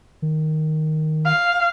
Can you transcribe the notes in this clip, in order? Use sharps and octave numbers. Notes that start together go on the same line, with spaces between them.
D#3
F5